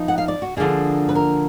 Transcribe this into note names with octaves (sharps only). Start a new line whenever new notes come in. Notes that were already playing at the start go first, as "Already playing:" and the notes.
Already playing: F3 B3 D#4
F#5
F5
D5
F#4
D3 F3 A#3 D4 G#4
B4
A#4